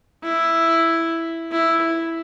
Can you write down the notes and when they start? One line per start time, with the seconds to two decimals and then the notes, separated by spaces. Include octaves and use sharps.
0.23 E4
1.52 E4